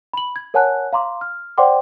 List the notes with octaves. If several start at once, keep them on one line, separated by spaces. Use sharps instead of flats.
B5 F#7
G#6
A#4 C#5 F#5 G#5 A5 F#6
F5 A#5 C6 D6
F6
C5 D5 F#5 G5 C6 D6